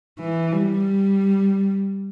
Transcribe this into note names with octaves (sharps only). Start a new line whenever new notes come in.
E3
G3